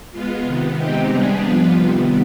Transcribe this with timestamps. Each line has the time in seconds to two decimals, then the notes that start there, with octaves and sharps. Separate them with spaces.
0.12 G#3 B3 F4
0.44 C3 D#3 B3
0.76 G#3 C4 D#4 G4
1.09 C3 G3 B3 D4 G#4
1.41 F3 B3 F4 B4
1.73 C3 D#3 G3 B3